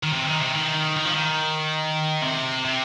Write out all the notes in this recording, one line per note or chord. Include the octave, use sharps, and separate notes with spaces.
D#3
C3
D#3
C3
D#3
D#3
F3
D#3
C3
C3